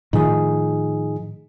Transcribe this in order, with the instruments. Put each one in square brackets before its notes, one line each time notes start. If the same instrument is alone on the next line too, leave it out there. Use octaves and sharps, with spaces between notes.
[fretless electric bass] A2 D#3 F3 [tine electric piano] D#4 G#4